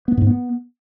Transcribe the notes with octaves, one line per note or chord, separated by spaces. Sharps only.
B3
G#2
B3